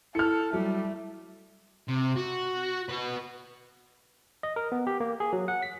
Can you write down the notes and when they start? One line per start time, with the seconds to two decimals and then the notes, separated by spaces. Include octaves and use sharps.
0.15 E4 A4 F6 C#7
0.53 F#3 G3 A3
1.88 C3
2.17 F#4
2.90 F#4 B4
4.43 D#5
4.56 A#4
4.72 B3
4.87 G4
5.00 A#3
5.20 G#4
5.33 F#3
5.48 F#5
5.63 B6